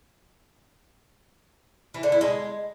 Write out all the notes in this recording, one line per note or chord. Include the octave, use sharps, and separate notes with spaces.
E3
D3
E4
G#3